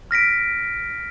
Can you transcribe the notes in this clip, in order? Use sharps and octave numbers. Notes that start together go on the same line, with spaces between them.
F6 A#6 B6 D7